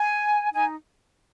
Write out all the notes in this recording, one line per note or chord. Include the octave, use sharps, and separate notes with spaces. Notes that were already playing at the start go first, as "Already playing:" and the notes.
Already playing: G#5
D#4 G#5